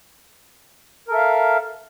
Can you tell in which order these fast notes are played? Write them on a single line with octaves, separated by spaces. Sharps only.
A#4 A4 E5 F5